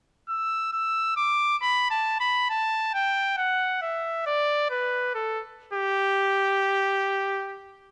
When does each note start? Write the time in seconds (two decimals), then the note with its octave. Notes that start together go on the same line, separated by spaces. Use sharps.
0.29 E6
0.73 E6
1.17 D6
1.62 B5
1.91 A5
2.20 B5
2.50 A5
2.94 G5
3.37 F#5
3.82 E5
4.26 D5
4.70 B4
5.15 A4
5.73 G4